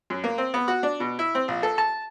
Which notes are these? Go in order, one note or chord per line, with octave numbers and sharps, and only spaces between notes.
F#2
A#3
C4
B3
F#4
D4
B2
E4
C4
A#1
A4
A5